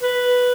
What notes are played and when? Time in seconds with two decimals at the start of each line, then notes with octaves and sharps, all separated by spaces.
0.03 B4